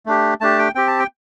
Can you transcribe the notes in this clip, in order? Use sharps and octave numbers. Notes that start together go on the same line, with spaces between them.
A3 D4 G4
A3 D4 G4 A5
G5
C4 G4 G5
A5
G5